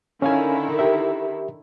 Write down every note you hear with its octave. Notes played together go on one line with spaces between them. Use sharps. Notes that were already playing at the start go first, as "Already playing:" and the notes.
D3 D#3 C#4 E4 F5 G#5
G4 A#4 E5